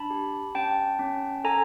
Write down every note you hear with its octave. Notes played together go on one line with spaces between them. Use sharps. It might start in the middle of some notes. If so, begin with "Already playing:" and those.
Already playing: D4 A5 B5
G4
C#4 G5 A5
C#4
A4 G#5 A#5